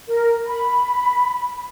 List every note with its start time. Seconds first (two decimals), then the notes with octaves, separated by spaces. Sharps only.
0.08 A#4
0.47 B5